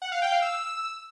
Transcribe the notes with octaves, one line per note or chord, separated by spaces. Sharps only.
F#5
F5
G5
F5
E6